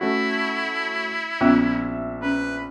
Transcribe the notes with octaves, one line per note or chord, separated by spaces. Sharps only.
A3 C#4 E4 F#4
A#1 B3 C#4 F4 E5 E6
C#4 B4